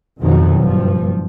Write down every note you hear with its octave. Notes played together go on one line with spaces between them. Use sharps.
F2 G#2 B2 D#3 F3 F#3
F#1 G2 F3